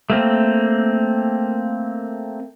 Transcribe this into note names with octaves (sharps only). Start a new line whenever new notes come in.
A3 A#3 C4